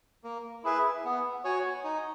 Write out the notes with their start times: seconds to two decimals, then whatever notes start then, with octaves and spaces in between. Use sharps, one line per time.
0.24 A#3
0.64 E4 G#4 B4 E5
1.05 B3
1.44 F#4 C#5 G#5
1.84 D#4